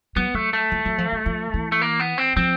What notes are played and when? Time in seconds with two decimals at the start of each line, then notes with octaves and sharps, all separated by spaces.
0.16 F#3 B3
0.34 F#3 A3
0.53 A3
0.71 F3
0.85 F#3
0.98 F3
1.12 F#3
1.26 F3
1.54 E3
1.72 A3
1.82 A#3
1.99 B3
2.18 C4
2.36 F3 C4